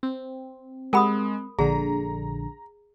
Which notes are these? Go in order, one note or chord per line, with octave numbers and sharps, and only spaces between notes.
C4
G#3 G4 A#4 F#5 B5 D#6
A#1 D3 G#4 A#5